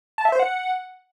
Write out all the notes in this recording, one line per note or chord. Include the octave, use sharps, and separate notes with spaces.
A5
E5
C5
F#5